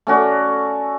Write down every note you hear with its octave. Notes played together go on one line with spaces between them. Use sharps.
A3 C#4 F#4 D5